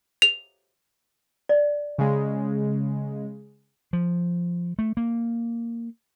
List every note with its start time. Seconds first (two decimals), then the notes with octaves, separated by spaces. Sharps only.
0.22 F7
1.49 D5
1.98 C#3 G#3
3.93 F3
4.79 A3
4.97 A#3